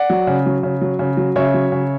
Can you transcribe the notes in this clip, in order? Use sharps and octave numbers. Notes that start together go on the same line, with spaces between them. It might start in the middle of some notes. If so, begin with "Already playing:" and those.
Already playing: D5 F#5
F#3
C#3
F#3
C#3
F#3
C#3
F#3
C#3 C#5 E5
F#3
C#3